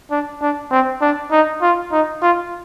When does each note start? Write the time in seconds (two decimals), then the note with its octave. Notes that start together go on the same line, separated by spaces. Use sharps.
0.11 D4
0.41 D4
0.71 C4
1.02 D4
1.32 D#4
1.62 F4
1.92 D#4
2.22 F4